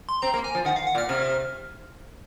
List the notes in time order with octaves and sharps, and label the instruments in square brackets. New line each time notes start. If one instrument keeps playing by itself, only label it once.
[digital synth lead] C6
[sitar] C4 [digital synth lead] A#5
[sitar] A#3
[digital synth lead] G#5
[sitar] F3
[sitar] D#3 [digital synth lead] F#5
[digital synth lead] F5
F#5
[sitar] A#2
[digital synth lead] F6
[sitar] C3 [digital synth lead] F6